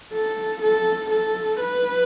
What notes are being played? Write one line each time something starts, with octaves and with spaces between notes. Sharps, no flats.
A4
A4
A4
B4